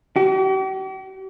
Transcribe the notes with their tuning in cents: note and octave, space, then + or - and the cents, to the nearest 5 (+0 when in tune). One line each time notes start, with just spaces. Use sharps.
G4 -45